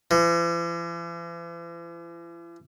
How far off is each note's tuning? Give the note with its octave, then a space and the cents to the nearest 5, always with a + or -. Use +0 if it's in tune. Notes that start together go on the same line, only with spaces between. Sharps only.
E3 +45